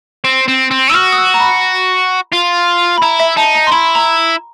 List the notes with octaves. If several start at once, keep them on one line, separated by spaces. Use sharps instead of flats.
C4
C4
C4
E6
F#4 F6
D#6
E6
A#5
B5
F4
B5
E4 A#5
E5
D#4 A5
A#5
C6
E4 B5
A#5